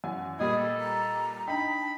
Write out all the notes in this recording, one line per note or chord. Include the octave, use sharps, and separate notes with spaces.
F#2 E3 F#5 G#5
A#2 G3 A#3 G#4 D#5 B5
A4
A#5
D4 D#4 G5 B5
A5